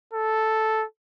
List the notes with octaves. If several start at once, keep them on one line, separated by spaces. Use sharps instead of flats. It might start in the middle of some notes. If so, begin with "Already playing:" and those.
A4